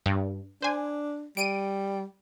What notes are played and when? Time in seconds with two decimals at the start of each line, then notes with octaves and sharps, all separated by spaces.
0.06 G2
0.62 D4 C5 G#5
1.37 G3 D7 D#7